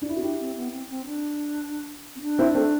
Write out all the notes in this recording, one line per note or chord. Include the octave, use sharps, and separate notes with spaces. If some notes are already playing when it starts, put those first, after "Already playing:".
D4
E4
C4 F#4
D4 E4 G4
C4
B3
C4
C4
D4
C4
D4
C4 E4
A3 C4